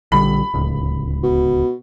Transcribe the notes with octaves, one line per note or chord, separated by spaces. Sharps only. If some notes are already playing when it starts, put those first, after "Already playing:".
A#1 D3 G3 B5
D1 C#2
B2